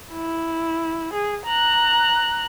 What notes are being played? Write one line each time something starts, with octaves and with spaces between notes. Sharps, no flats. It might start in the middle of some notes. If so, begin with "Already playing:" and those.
E4
G#4
A#5 F#6